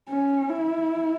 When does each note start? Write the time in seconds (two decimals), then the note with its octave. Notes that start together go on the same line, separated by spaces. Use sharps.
0.09 C#4
0.49 E4